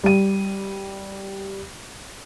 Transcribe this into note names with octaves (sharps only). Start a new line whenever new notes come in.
G3 D#7